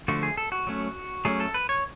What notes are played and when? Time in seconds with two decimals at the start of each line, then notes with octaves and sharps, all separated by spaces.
0.08 D3 F3 A3 F#4
0.23 G#4
0.37 A4
0.52 F#4
0.67 F#3 A3 C#4
1.25 F#3 A3 C#4 G#4
1.40 A4
1.54 B4
1.69 C#5